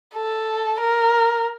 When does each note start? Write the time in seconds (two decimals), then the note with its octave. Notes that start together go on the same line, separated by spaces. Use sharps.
0.15 A4
0.81 A#4